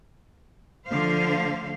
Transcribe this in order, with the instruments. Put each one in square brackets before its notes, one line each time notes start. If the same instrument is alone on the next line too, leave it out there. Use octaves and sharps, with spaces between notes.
[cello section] D3 F3 A3 C5 F5